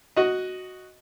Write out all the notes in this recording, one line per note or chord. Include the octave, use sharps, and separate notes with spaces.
F#4 D#5